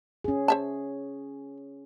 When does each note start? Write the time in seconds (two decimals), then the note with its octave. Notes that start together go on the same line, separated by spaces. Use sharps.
0.24 C#4 G#4
0.48 C5 E5 A5